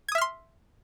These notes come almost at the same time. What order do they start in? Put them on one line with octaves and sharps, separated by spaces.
G#6 D#6 E5 F6 C6